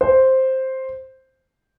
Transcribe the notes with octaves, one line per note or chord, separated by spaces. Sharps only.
C5